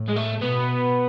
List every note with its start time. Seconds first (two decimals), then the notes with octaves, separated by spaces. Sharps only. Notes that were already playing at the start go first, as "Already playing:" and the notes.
Already playing: A2
0.08 G#3
0.16 A3
0.41 B2 B3